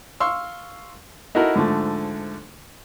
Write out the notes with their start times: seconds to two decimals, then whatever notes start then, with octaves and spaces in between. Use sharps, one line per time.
0.20 F5 C6 C#6 E6
1.35 D#4 E4 F#4 A4 A#4
1.56 G#2 D3 F3 A3